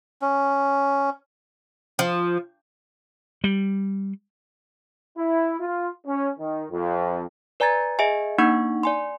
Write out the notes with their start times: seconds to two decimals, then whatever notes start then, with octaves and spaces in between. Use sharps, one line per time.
0.22 C#4
1.99 F3
3.44 G3
5.17 E4
5.60 F4
6.06 C#4
6.39 D#3
6.70 F2
7.60 B4 D5 G#5 A#5 G#6 A6
7.99 G#4 D#5 E5 G#5
8.38 A#3 D4 D#4 F#5 C#6
8.83 D5 G#5 C6